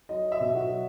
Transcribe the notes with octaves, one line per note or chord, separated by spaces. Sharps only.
F#3 D#5
E5
B2
F#4
F#3